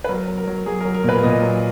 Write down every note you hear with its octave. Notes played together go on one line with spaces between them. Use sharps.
B4
F#3 A#4
F#3
A#4
F#3
F#3 G#4
F#3 A#4
A#4
A#2 B4
A#2 D#5
F#3